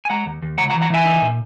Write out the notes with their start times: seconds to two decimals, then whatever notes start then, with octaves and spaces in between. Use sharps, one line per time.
0.05 G#5
0.10 G#3 F#5 A#5
0.26 D#2
0.43 D#2
0.58 C#2 F#5 A#5
0.70 F#5 A#5
0.74 E3
0.82 F#5 A#5
0.90 E3 E5 G#5
1.06 D#4
1.22 A#2